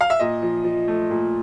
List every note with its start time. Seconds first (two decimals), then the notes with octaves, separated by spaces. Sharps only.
0.01 F5
0.10 E5
0.20 A#2 D#5
0.42 F3
0.64 F3
0.88 A3
1.10 A#2